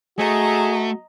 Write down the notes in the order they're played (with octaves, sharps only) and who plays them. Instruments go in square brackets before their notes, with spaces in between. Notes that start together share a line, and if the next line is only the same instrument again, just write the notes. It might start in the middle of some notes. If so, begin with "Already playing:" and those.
[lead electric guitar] A3 [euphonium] F#4 [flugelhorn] G#4 [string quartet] D#5 A#5